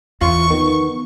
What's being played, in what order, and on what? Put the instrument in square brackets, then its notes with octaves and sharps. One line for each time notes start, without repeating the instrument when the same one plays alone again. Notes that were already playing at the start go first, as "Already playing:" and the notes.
[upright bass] E2 [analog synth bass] F4 [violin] C#6
[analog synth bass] D#3 [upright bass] F3 [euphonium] B3